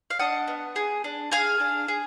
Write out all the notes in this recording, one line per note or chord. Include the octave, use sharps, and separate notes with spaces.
F5
D4 D#5 F#5
B3
G#4
D4
G#4 F5 G#5
D4
G#4